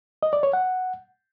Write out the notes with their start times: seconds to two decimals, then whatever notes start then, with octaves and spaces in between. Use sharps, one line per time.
0.23 D#5
0.33 D5
0.43 C#5
0.53 F#5